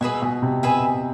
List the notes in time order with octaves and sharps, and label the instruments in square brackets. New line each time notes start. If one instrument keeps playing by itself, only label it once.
[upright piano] B2 [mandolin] G#4 B4 E5 G#5
[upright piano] B2
C3
[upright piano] B2 [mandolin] G#4 B4 E5 G#5